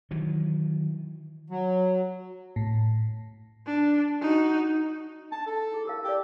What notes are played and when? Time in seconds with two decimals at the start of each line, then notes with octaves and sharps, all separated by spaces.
0.11 D#3 E3 F#3
1.50 F#3
2.56 A2
3.66 D4
4.22 D#4 F#4
5.32 D4 A5
5.47 A4
5.72 E4 G#4
5.85 G4 A#4 F5
6.04 G4 A#4 D5